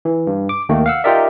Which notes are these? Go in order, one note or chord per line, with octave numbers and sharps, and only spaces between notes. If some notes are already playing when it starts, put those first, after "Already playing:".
E3
G2
D6
D#2 D#3 A3 A#3
F5 F#5 E6
D#4 F4 G4 A#4 D5 E5